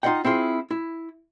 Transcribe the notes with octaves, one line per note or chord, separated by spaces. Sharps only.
D#4 F4 A#4 D#5 F#5 G5
C4 E4 F4 G#4
E4